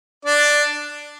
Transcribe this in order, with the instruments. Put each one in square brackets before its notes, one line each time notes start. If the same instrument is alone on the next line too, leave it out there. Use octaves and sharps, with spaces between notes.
[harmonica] D4 D5